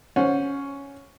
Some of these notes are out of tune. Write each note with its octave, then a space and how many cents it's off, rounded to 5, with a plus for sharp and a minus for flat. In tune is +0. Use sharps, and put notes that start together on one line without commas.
C#4 +5 C5 +0 F#5 -30